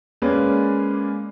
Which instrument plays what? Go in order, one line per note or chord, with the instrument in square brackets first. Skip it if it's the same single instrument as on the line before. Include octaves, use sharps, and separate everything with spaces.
[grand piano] G#3 A#3 C#4 G#4 B4 D5